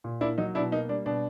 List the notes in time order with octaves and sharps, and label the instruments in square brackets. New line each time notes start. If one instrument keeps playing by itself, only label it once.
[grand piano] A#2
A#3 D4 E4
F#3 D#4
B2 D4 E4
A#3 D#4
G3 D4
B2 D4